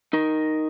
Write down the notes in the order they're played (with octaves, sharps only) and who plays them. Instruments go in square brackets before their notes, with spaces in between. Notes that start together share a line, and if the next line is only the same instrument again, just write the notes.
[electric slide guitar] D#4 A#4